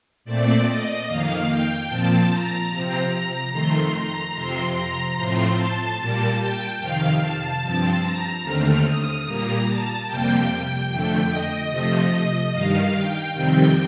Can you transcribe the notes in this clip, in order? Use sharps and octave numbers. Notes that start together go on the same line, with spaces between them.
A#2 A3 C4 D5
D#5
F2 D#3 A#3 F5
G5
A#2 F3 C4 A5
A#5
C3 F3 C4
F2 D#3 A3 C6
A#5
F2 C3 F3 C4 C6
A#5
A2 F3 A3 C4 C6
A5
A#2 G3 A#3
G5
F2 C3 D#3 F5
A5
G2 F3 C4 A5
A#5
D#2 D3 A3 C4 F6
D#6
A#2 G3 A#3 A#5
A5
F2 C3 G3 A#3 G5
F2 D3 A3
D#5
C3 F3 A3
G2 D#3 G3 F5
G5
F2 C3 D#3 G3 C4 G5